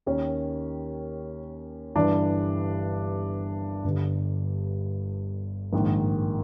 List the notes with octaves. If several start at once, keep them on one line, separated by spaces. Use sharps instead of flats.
D#2 D#3 C#4
G1 G2 E3 D4
G1 G2 D3
A#1 G#2 D#3